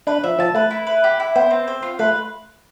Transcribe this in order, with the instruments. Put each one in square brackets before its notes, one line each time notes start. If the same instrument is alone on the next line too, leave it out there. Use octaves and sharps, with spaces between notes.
[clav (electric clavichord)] D4 [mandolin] B4
[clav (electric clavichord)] F3 [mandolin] E5
[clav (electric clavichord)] F3 [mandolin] A5
[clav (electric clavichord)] A3 [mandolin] B4
[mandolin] E4
B4
G4
E4
[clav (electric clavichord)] B3 [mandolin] C5
[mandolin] C4
C5
F4
[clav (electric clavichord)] A3 [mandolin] B4